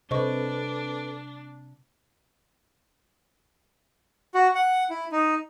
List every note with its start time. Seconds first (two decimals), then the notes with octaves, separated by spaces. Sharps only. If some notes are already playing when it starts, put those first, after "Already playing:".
0.11 C3 D4 A4 B4 C5 D#5 C#6
4.34 F#4
4.55 F#5
4.90 E4
5.12 D#4